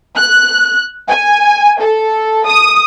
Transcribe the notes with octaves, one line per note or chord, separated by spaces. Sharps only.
F#6
G#5
A4
D#6